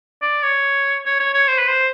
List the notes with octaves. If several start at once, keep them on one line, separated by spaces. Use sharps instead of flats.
D5
C#5
C#5
C#5
C#5
C5
B4
C5